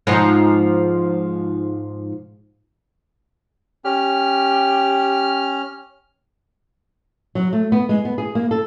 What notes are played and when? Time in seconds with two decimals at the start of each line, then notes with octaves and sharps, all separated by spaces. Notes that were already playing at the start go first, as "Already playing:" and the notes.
0.07 G#2 F3 D#4
3.85 C#4 G4 F6
7.35 F#3
7.53 A3
7.72 B3
7.89 G#3
8.05 B3
8.18 G#4
8.35 A#3
8.51 A4